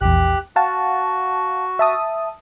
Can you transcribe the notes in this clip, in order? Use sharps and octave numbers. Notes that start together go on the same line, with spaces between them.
A#1 E2 G4 F#6
F#4 F5 F#5 A5
E5 A5 D#6